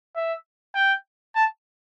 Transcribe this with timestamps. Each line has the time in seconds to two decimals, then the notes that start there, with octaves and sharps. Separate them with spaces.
0.16 E5
0.75 G5
1.35 A5